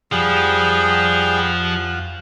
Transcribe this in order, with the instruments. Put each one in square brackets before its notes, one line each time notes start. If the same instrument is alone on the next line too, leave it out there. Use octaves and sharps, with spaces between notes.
[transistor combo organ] F2 F4 F#5 [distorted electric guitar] F3 [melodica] G3 G#4 G5